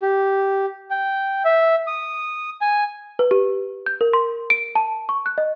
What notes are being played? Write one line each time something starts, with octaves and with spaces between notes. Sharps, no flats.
G4
G5
E5
D#6
G#5
B4
G4
G6
A#4
C6
D7
A5
C#6
F#6
D#5